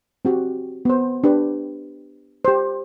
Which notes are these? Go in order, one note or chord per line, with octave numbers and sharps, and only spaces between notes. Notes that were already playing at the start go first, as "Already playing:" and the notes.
C4 F#4 G4
B3 C5
D4 G4 B4
G4 C5